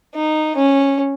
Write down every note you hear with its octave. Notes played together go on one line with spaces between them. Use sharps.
D#4
C#4